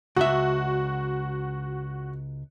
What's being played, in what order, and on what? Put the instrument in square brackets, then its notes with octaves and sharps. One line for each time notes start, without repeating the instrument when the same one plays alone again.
[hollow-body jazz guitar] C#2 E5 [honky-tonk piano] F#4